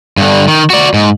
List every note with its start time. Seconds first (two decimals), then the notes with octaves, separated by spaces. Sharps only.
0.17 G2 D3
0.48 D#3
0.70 F#4 D5
0.94 G#2